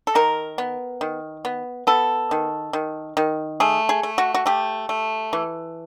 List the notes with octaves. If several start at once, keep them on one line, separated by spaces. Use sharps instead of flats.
A4
D#3 A#4
B3
D#3
B3
B3 A4
D#3
D#3
D#3
A3 G#4
G#4
A3
F#4
F#4
A3 G4
A3
E3